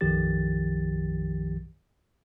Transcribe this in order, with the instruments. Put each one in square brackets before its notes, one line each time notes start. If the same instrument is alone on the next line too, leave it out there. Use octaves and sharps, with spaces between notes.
[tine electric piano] B1 F#2 D#3 F3 G4 A6